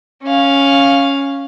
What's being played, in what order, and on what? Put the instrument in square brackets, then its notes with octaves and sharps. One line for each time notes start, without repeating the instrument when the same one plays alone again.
[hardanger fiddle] C#4 F5